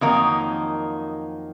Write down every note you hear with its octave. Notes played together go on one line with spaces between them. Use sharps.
F2 D#3 F#3 A#3 D#4